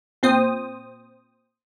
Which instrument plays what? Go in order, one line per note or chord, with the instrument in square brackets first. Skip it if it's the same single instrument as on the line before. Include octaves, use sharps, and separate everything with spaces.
[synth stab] A#2 C4 C5 D#6